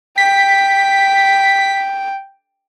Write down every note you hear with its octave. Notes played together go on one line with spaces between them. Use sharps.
G5 B6